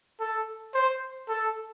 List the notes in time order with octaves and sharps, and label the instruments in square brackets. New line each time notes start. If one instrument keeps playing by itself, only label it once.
[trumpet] A4
C5
A4